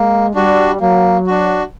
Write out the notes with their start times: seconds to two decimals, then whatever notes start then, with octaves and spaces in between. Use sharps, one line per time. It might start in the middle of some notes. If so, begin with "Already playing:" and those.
Already playing: G#3 A#3
0.35 G3 D4 F#4
0.80 F#3 A#3
1.27 D4 F#4